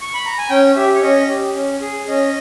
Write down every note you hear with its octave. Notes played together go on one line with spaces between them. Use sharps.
C#6
B5
A#5
G#5
C#4 G5
G4 E5
C#5
C#4 D#5
G4
C#4
G#4
C#4 D#5